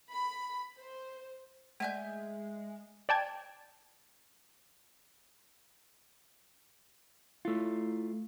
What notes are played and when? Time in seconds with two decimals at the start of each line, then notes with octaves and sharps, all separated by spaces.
0.10 B5
0.77 C5
1.80 G#3 A3 D5 E5 G#5 G6
3.09 D5 G5 A5 G#6
7.45 A3 E4 F4